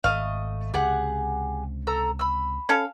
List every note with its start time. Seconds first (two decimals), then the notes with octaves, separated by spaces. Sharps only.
0.04 G#1 A3 D#5 F5
0.74 C#2 C3 G4 G#4 F#5
1.87 A4 A#5 E6
2.19 B5 E6
2.69 C#4 A4 F5